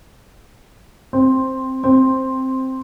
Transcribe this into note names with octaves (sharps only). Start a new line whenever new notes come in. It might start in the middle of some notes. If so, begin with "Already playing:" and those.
C4
C4